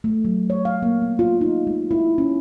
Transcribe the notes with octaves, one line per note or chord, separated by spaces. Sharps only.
A3
F#3
C#5
F5
A#3
B3
F4
D#4
G#3
E4
C#4